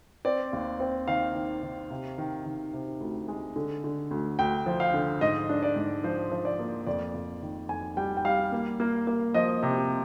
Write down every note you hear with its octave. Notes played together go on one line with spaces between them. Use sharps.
C4 D5
D#2
C4
D#3 F5
D#3
D#3
C3
D#3
D#3
C3
D2
G#3
D3
D3
D2
D2 G5
F3
F5
D3
G#2 D#5
D4
D5
G#2
F3 C5
F3
D5
A#3
F2 D5
F2
D#3
F2 G#5
G3 G5
G5
G3 F5
A#3
A#3
A#3
F3 D#5
C3